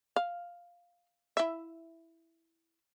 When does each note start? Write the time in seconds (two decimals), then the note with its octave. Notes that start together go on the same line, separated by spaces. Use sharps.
0.16 F5
1.37 E4 E5